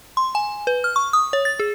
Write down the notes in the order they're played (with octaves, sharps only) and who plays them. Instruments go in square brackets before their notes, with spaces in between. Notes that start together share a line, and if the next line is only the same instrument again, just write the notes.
[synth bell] C6
G#5
B4
F6
C#6
D#6
C#5
A6
G#4